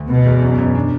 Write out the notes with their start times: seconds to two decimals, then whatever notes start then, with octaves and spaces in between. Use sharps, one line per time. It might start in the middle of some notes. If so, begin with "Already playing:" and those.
Already playing: D2
0.09 B2 B3
0.26 E2
0.42 F#2
0.58 F#2
0.75 D4